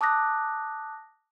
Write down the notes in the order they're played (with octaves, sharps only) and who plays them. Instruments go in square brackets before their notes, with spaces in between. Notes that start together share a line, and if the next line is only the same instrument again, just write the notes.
[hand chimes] A5 D6 D#6 F#6 A#6